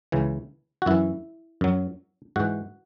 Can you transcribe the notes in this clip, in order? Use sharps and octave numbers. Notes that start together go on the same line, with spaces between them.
C#2 C#3 E3
F#4
F#2 E3 E4
F#2 F#3
G#2 E3 F#4